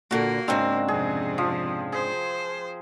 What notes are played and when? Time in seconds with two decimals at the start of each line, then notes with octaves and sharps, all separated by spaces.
0.11 A#2 D3 A#3 F#4
0.48 G#2 C#3 C4 D4
0.88 F2 C3 G#4
1.38 F3
1.92 G#4 C5